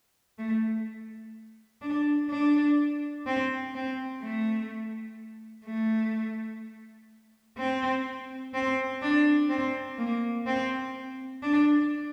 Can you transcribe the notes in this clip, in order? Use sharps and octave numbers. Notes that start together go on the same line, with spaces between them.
A3
D4
D4
C4
C4
A3
A3
C4
C4
D4
C4
A#3
C4
D4